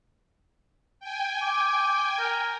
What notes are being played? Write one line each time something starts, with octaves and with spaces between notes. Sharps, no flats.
G5 G#5
D6
A#4